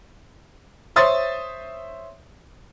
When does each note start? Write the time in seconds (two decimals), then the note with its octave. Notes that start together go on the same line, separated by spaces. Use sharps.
0.96 C5 C#5 E5 C6 D#6 A6